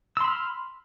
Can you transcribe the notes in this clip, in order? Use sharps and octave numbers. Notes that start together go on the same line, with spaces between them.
B5 C6 E6 F6